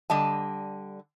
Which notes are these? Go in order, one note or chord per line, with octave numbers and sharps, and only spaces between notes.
D3 G3 D#5 A5